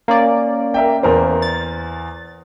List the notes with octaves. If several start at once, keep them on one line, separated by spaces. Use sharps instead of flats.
A#3 C#4 D5
A#4 E5 G5
E2 A#4 C5
A6